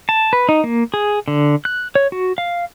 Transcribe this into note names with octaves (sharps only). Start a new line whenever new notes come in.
A5
B4
D#4
A#3
G#4
D3
F#6
C#5
F#4
F5